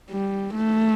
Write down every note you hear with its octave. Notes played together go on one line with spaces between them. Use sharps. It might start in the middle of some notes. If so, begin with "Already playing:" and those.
G3
A3